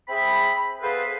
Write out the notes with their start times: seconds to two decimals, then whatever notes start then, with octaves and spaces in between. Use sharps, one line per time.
0.08 C4 G#4 E5 B5
0.82 B3 G#4 A4 B4 C5 F5